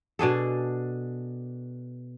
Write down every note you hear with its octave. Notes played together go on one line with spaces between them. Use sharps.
B2 D4 G#4 A4